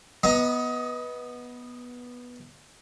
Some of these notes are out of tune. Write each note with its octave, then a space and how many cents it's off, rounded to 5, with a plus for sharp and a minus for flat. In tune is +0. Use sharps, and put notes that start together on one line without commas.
B3 -10 D#5 +20 A#5 +0